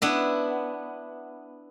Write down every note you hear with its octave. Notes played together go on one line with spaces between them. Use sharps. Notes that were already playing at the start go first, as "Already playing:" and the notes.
B3 D4 E4